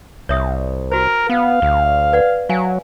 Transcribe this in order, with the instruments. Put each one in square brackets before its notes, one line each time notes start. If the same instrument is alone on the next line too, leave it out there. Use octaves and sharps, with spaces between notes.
[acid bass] C2 [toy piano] C#5 E5 D#6
[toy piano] F#4 C5 [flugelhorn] A#4
[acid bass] B3 [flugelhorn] F5
[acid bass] D2
[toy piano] B4 D5 F#5
[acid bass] F#3 [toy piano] F5 G#5